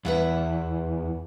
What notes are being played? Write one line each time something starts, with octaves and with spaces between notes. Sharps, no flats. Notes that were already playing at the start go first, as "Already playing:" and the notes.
E2 B4 E5 F#5